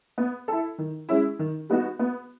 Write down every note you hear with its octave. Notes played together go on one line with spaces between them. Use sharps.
B3
E4 A4
D#3
G#3 C#4 E4
D#3
G3 B3 D#4 F#4
B3